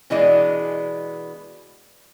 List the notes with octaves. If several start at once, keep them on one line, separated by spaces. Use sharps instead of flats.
B2 E3 G#3 B3 D4 D#5